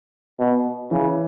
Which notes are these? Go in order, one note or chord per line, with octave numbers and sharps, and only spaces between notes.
B2
C#3 E3